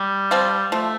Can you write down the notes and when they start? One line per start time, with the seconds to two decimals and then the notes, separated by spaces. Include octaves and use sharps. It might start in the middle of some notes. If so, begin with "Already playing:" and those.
Already playing: G3
0.31 F3 C4 F4
0.72 F3 A3